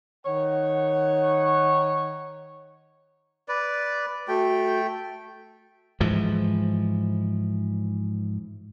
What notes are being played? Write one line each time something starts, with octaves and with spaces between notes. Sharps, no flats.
D#3 C#5 F#5
B4 D5
A3 F#4 G5
G#2 E3 F3